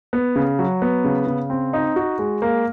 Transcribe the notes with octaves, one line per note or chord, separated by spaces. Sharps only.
B3
C#3
F#3
B3
C#3
C#3
C4
D#4
F#4
G#3
A#3